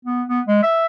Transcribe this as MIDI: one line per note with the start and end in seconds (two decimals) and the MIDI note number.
0.05 0.22 59
0.29 0.41 59
0.47 0.58 56
0.63 0.86 76